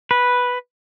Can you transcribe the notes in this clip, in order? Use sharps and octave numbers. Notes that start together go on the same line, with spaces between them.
B4